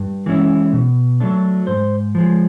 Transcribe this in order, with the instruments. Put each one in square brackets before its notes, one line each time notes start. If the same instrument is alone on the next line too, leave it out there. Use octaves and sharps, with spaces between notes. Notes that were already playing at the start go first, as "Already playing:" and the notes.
Already playing: [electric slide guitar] G2
E3 G#3 C#4 E4
B2
F#3 A3 D4
G#2 C5
F3 G#3